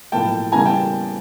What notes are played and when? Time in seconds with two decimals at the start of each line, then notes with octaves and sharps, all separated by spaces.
0.12 B1 A2 F3 A#3 G5 A5
0.52 E2 C#3 E3 G3 A#3 G#5 A#5
0.66 G5 A5